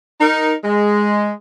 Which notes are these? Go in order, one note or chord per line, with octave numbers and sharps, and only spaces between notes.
D#4 A#4
G#3